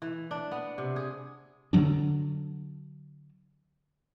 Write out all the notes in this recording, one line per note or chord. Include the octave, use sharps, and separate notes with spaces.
E3
D4
B3
C3
G#4
D3 E3 F#3 D4